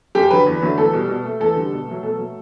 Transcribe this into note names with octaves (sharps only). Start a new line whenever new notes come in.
F#2 G4
D3 F#3 B4
E2
D3 F#3 A3
E2 A4
B2 G3
B2
A3
E2 A4
D3 G3
B2
F#3 A3
B2 A4
F#3 A3